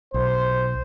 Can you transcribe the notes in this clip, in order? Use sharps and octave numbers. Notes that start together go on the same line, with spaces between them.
B1 C5